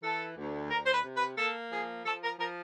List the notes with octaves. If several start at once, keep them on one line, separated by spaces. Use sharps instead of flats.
E3 A4
D2
D2 A#4
C5
B4
C3
B4
A#3 A4
F3 G#4
F3 A4
A#4
F3 A#4